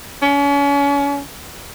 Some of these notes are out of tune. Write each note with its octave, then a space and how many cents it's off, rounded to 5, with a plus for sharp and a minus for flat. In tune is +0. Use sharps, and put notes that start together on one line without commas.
C#4 +35